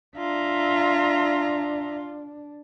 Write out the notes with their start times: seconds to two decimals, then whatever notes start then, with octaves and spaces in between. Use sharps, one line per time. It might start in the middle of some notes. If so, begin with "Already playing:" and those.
0.17 D4 F4 E5 A#5